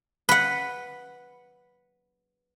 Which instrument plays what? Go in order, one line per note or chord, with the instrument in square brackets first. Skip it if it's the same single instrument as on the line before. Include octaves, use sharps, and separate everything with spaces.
[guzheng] B4 F#5